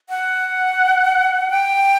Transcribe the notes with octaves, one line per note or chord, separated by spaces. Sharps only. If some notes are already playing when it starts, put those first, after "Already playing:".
F#5
G5